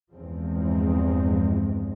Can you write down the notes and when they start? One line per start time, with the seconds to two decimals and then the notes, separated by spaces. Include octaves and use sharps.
0.13 E2 G2 F3 G#3 C4